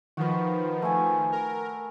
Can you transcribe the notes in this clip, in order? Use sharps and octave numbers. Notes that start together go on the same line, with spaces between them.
D#3 F3 F#4 B4
A3 G#5
A#4